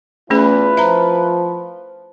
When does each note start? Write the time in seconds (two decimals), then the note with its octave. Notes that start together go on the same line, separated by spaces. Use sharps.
0.30 E2 A3 C#4 E4 F4 G#4 B4
0.77 F3 E5 A#5